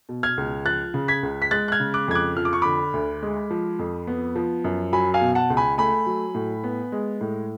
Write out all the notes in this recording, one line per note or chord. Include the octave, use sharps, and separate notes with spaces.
B2
F6 G#6
C#2
F3 F#6 A6
C#3
G#6 B6
C#2
B6
G#3 F#6 A6
F#6
F6 G#6
C#3
D6 F#6
F2 G#6
D6 F#6
F3 F6
D6
C#6
D3 B5 D6
D2
G#3
F3
F2
B3
F3
F#2
F#3 G#5 B5
F5 G#5
B2
F#5 A5
C#2
G#5 B5
A3 G#5 B5
F#3
A2
B3
G#3
A2